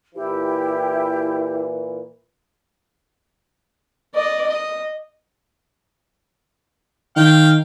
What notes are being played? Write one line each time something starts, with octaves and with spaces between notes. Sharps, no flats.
A#2 E3 E4 G4
D5 D#5
D#5
D#3 F5 G5